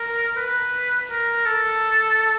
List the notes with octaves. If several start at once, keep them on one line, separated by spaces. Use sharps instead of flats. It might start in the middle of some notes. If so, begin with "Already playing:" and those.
Already playing: A#4
B4
A#4
A4